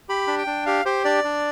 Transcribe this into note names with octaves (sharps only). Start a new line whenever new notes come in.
G4 B5
D4
G5
D4
G4 F5
G4 C5
D4 D5
D4